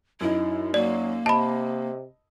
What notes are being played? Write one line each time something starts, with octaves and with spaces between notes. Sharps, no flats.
F#2 D#4 E4
F#3 A#3 D5
C3 D#5 A5 B5